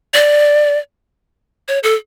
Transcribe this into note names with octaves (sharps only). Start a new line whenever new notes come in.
D5
C#5
A4